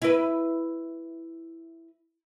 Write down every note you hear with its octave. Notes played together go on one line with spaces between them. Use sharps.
E4 B4